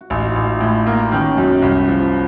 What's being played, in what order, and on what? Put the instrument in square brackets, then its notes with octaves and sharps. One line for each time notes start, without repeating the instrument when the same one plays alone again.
[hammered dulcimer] F#4
[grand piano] A1 [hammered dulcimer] D#4 F4
[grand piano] A1
A2
A#3
[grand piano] D#3 [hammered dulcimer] B3 C#4
[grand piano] F#2
C2
F3